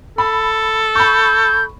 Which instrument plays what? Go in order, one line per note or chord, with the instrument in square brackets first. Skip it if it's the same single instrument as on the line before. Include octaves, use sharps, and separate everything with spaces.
[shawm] A4 [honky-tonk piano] B5
[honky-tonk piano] B5 C#6 [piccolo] G6